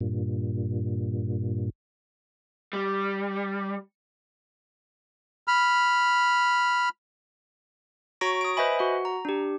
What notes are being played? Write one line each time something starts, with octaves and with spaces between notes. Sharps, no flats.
G2 A#2
G3
B5 F6
F#4 C#5 A#5 C#6 A#6 D7
D#6 D7
B4 C5 D#5 E5 G#5 B5
F#4 F#5
A#5
D4 G4